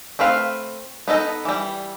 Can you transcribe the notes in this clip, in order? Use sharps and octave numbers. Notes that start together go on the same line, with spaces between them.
A3 C4 B4 F5
B3 D#4 A4 D#5
E3 G3